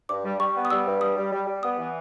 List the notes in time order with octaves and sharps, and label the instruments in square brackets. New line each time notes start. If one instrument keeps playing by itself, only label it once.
[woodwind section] G2 [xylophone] D6
[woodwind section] G3
[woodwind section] G3 [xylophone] C#6
[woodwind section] B3
[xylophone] D#6
[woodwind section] G3 [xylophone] E6
[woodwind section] G2
[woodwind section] G3 [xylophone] D#6
[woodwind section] G3
G3
G3
[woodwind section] B3 [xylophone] D#6
[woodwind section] E3